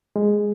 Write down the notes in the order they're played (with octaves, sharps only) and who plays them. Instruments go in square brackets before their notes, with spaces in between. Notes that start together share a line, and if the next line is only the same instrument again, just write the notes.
[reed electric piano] G#3